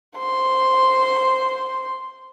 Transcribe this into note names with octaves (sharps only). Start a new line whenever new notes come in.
C5 C6